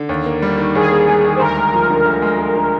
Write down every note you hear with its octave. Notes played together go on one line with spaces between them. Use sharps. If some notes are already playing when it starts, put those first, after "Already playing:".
Already playing: D3
D#2
A#3
G3
D#3
D#2 G#4
A#3
G3
D#3
C5
D2 A#4
G#3
F3
D3
D2
G#3
F3
D3